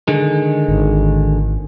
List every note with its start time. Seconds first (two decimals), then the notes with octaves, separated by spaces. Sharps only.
0.08 D3 D#3 G#3
0.68 G#1